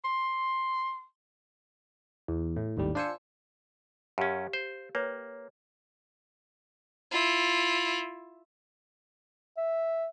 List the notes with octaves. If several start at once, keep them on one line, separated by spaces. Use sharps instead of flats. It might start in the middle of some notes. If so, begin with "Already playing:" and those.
C6
E2
A2
G#1 D#2 A2 G3
D4 F4 C5 G#5 E6 C#7
F#2 C#4 G4 F5
C5
A#3 B4 C#5 G5
E4 F4
E5